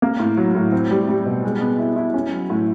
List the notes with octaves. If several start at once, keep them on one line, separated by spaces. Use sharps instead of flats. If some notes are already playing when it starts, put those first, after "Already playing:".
A#3
A2
F#3
A2
C4
G3
G3
B2
G#3
B3
E4
E4
C#4
F#3
A2